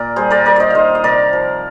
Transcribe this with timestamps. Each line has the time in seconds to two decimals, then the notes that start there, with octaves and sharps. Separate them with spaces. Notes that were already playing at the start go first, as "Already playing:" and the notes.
Already playing: A#2 A#4 D5
0.16 G3 G#4 C5
0.31 A#4 D5
0.45 G3 A#4 D5
0.56 C5 D5 D#5
0.70 D#3 C5 D#5 F5
0.95 D#5
1.04 C3 A#4 D5
1.33 F3